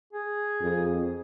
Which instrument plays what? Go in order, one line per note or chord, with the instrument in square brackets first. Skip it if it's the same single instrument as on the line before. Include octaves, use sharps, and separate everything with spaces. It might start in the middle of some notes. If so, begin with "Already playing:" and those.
[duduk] G#4
[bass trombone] F2